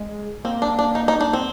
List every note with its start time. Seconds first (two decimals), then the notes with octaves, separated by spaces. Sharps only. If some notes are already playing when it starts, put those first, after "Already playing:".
Already playing: G#3
0.44 A#3 C4
0.62 D4
0.79 D4
0.95 D#4
1.08 D#4
1.21 D4
1.33 C4